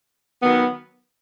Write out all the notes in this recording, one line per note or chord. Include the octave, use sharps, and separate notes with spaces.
D#3 F#3 B3